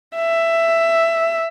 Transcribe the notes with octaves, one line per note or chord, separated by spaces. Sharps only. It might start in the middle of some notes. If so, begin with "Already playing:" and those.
E5